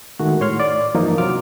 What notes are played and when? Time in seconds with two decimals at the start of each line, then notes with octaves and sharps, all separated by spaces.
0.20 D#3 G#3 A3 F#4
0.41 A2 C#5 C6 F6
0.60 D5
0.95 G2 E3 F3 A#3 D#4
1.18 C3 F#3 F4 D6 F6